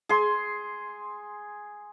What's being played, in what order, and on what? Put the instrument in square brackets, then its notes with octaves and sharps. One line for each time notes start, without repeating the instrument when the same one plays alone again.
[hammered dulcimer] G#4 C6